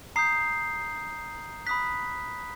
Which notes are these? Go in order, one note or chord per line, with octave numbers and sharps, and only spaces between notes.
A#5 D#6 G6 C7
B5 D#6 F#6 B6